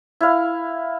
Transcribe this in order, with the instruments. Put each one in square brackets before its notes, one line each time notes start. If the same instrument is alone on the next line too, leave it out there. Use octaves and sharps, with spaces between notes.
[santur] E4 F5